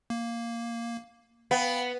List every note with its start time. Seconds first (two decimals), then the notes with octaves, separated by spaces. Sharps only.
0.10 A#3
1.51 B3 F5 G5 B5